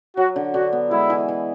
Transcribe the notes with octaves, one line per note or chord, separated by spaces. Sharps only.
F#3 F#4
D3
D3 F#4
B3
G#3 E4
E3
E3